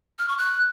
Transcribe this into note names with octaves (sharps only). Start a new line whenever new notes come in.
F6
C#6
F#6